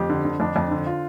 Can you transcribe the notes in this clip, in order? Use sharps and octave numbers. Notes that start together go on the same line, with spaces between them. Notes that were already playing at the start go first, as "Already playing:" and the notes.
Already playing: F2 G4
D3
D3
F2 D4
F2
D3
F4